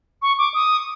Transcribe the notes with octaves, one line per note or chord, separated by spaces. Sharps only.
C#6
D6
D#6